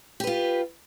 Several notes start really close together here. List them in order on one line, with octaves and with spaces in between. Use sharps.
G4 B4 F4